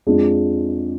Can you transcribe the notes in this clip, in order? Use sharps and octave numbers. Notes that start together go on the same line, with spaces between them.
F2 F3 G#3 D4 G#4